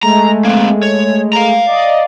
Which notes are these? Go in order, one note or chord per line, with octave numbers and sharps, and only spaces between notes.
G#3 A3 A#5
A#3 C4
C#5
F5 A#5
D5 D#5